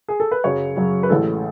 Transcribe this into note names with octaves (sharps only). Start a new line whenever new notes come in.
G#4
A4
B4
F#2 C#3 F#3 C#5
F#2 C#3 F#3
B4
A1 A2 G#3 A4